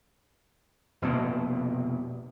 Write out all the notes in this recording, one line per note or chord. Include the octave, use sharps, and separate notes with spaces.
F1 B2 A#3